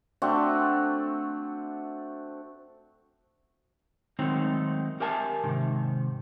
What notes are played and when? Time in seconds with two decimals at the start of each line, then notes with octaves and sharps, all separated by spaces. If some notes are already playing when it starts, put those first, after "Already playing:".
0.22 A3 C4 D4 F#4
4.19 D#3 F#3 G#3 A3 C4 D#4
5.00 G4 A#4 E5 G#5 A5
5.44 G#2 C3 D#3